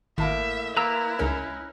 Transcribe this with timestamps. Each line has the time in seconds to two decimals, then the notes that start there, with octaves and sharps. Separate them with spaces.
0.18 G#1 A2 A#3 E5 A5
0.77 A#3 E4 B4 A#5 E6
1.19 C#2 C#3 C#4 D#4 A#4